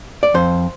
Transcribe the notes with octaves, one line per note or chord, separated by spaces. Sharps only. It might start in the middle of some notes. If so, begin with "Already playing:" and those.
D5
F2 C5